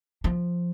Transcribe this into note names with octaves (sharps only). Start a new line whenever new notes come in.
F3